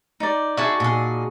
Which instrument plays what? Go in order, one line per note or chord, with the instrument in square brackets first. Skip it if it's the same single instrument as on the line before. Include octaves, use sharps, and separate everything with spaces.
[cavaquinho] D#4 D5
[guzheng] F#4 G#5 A5 [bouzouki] G#4 E5
[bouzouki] A#2 G#4